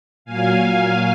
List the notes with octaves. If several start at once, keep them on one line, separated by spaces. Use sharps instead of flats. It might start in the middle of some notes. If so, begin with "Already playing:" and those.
A#2 F#3 F5 G#5